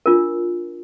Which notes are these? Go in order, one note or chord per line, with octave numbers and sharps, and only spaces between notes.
D4 F4 A#4